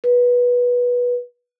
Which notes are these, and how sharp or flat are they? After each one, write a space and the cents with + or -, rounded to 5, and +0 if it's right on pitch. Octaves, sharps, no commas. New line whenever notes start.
B4 -15